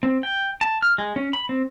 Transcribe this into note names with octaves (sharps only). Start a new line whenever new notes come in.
C4
G5
A5
F6
G#3
C#4
B5
C4